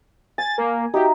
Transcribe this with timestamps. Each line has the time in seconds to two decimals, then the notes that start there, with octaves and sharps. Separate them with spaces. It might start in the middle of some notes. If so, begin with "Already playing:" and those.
0.38 G#5 A6
0.58 A#3
0.94 D#4 F#4 G4 E5